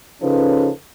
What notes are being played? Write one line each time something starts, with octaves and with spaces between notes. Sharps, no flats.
C#3 F3 C#4 D#4 A4 B4